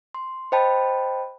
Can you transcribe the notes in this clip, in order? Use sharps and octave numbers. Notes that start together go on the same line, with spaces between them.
C6
C5 D#5 G5 A5 B5